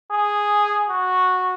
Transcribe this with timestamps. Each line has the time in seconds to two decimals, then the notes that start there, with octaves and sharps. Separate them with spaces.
0.11 G#4
0.89 F#4